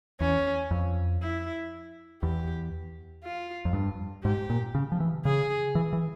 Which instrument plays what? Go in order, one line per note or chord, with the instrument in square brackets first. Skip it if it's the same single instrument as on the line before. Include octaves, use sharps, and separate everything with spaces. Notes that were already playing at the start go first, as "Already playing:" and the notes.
[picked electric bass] E2 [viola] C#4
[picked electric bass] F2
[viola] E4
[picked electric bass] E2 [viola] G4
[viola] F4
[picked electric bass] F2
G2
[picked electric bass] G#2 [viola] G4
[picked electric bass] A#2
C#3
F3
E3
[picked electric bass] C#3 [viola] G#4
[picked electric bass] E3
E3